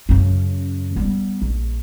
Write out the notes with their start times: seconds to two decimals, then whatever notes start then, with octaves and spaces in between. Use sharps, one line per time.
0.09 F#2 C#3
0.96 G3 B3
1.42 A#1